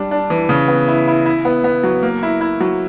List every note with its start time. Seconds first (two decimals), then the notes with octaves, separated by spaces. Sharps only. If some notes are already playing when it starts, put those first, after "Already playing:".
Already playing: G3 D4
0.11 D4
0.30 E3
0.49 C#3
0.68 B3
0.88 E4
1.07 E4
1.26 E4
1.45 B3
1.64 B3
1.84 F#3
2.03 A#3
2.23 E4
2.41 E4
2.61 F#3